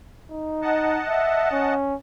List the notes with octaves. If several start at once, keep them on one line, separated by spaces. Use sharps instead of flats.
D#4
D#5 F#5 A5
E5
C#4